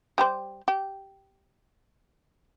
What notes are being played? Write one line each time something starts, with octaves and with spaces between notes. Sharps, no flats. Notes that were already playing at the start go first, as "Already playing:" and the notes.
G3 G4 C5
G4